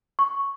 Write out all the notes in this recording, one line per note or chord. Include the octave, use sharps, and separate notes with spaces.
C#6